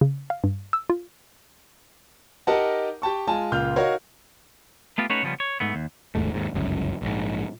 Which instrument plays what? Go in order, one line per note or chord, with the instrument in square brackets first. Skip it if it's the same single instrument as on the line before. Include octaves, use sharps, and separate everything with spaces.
[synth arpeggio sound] C#3
F5
G2
E6
F4
[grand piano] D#4 G4 A#4 D#5 F#5 A5
G4 G5 A5 C#6
G#3 F4 G#5 A5
C#2 A#2 F4 F5 F6 G6
D#4 F#4 A#4 C#5 F5
[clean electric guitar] A3 B3 F4 G4
A3 C#4 D#4 F#4 B4 C#5
C#3 F3 G3 B3 C#4
C#5
G#2 A3 B3
D#2
[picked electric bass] F1 D#2 G#2 A3
D#2 G#2
G1 C#2 F#2
A#1 G#2